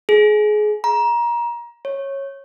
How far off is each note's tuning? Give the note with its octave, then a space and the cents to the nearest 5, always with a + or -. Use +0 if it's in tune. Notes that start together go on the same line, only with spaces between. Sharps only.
G#4 +25
A#5 +25
C#5 -15